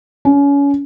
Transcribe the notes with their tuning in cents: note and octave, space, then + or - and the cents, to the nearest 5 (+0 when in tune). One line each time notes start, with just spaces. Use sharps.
C#4 +30